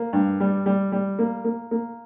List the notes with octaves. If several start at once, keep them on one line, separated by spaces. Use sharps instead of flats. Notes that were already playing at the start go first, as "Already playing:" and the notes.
Already playing: A#3
G2
G3
G3
G3
A#3
A#3
A#3